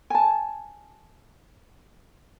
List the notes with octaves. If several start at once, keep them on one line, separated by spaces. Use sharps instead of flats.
G#5 A5